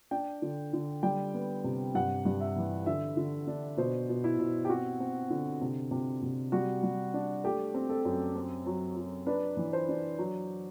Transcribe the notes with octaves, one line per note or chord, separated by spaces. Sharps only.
D4 G5
D3
D3
G3 G5
B3
C3
G2 F#5
G2
E5
E3
D3 E5
D3
D4
B2 C5
B2
E4
B2
G4
C4 F#4
C4
D3
C3
C3
C3
G3 F#4
G3
D4
A3 G4
C4
A4
F#2
C4
F#3
F#3
D4 B4
E3
C5
D4
F#3